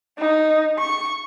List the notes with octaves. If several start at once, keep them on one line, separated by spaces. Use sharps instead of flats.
D#4
C#6